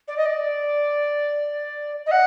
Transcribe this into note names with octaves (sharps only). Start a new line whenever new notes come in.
D5
D#5
D5
D#5
F#5